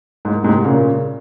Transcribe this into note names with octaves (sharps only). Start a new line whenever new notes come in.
G#2
G#2 C3
A#2 C#3